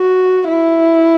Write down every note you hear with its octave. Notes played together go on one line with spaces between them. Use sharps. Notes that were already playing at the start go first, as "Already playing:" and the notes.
Already playing: F#4
E4